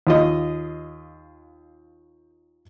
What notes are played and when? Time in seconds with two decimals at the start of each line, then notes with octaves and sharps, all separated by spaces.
0.07 D#2 F4 D#5